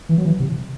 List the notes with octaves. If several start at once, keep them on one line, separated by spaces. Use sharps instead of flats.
E3
F#3
E3
C3